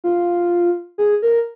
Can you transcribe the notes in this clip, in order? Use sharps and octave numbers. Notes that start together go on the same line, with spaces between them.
F4
G#4
A#4